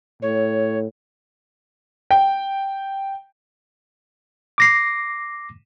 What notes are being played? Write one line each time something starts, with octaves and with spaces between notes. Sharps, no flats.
A2 C#5
G5
D6 A#6 C7